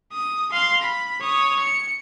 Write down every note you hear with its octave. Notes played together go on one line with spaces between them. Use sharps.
D#6
F5 C6
B5
C#5 D#6
C#7